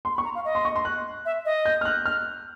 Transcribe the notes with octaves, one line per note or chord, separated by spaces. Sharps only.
C6
B5
C#6
A#5
F5
D#5
C6
C#6
C6
F#6
E5
D#5
G6
F6
F#6
F6